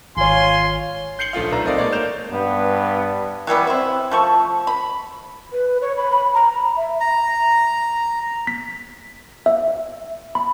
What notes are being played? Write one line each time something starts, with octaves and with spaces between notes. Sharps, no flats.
G#1 F4 C#5 G#5 C6
G6 C7 C#7 F#7 G7
A#1 A3 F4 F5
B1 D4 B4 E5 A#5
C4 A4 A#4 D5 D#5 F5
G#3 A#3 D#4 C#5 D5
A3 A#4 G6 E7 F7
G2 B3
E3 F#3 G3 B3
C4 E4
F3 A3 C#6
B5
B4
C#5
B5
B5
A#5
B5
E5
A#5
B6
E5
B5